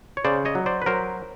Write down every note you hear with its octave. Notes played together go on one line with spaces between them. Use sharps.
C#5
C#3 C5 D5
C#5 D#5
F#3
C5 D5
B4
F#3 A#4 C5